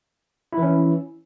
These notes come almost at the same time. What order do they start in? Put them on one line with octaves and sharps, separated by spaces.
E4 E3 C#4